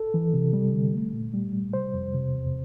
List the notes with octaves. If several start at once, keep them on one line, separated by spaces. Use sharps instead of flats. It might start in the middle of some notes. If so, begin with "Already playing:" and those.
Already playing: A4
E3
C3
G3
D3
A3
A#2
G3
G3
C3 C5
F2
C3
E2